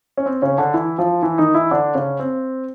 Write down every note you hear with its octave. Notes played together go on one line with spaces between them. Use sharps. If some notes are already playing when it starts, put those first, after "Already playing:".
C#4
C4
C#3 C#4
D3 D4
E3 E4
F3 F4
E3 E4
D#3 D#4
E3 E4
D3 D4
C#3 C#4
C4